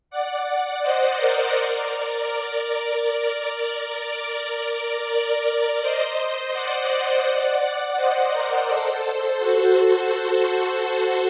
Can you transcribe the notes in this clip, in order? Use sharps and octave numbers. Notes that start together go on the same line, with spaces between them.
D5 F#5
D5 F#5
C5 D#5
A#4 D5
A#4 D5
A#4 D5
A#4 D5
C5 D#5
D5 F#5
C5 D#5
A#4 D5
A4 C5
F#4 A4